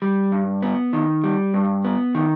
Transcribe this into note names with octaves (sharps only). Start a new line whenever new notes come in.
G3
G2
B3
D#3
G3
G2
B3
D#3